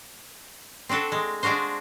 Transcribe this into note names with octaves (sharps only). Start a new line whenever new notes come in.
C4 D4 F#4 A4 A5
G#3
G#3 D4 F4 F#4 C5